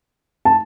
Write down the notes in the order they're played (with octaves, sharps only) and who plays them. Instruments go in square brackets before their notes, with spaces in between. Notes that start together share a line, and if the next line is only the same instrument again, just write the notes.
[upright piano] A5